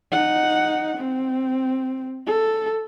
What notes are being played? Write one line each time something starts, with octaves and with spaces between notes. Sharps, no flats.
D#4 F#5
C4
A4